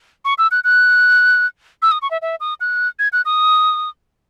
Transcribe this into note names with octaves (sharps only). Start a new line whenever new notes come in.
C#6
E6
F#6
F#6
E6
D#6
C#6
E5
E5
D#6
F#6
G#6
F#6
D#6